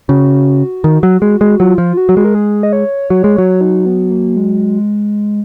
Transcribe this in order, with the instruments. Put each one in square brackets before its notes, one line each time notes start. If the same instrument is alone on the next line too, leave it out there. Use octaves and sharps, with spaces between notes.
[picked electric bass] C#3 [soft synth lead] F#4
[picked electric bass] D#3
F#3
G#3
G#3
[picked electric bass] F#3 [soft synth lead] F4
[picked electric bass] F3
[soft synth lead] F#4
[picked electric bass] F#3
G#3
[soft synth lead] A#4
G#4
D#5
C#5
[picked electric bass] F#3 [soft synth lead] C#5
[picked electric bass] G#3
[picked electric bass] F#3 [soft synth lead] C#5
[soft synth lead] D#4
B3
A#3
G#3